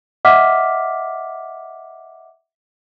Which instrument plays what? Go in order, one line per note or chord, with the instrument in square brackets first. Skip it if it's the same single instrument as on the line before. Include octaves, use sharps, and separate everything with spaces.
[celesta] D#5 E5 F#5 D6 F6 B6